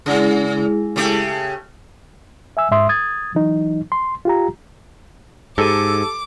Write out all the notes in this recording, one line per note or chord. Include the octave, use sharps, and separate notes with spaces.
C#3 G#3 E4 G#4
C#3 A3 G4
E5 G#5 E6
G#2 E5 C6 D#6
D#6 G#6 A6
E3 F#3 D#4
C6
F4 G4 A#5
G#2 G4 A4 D6 D#7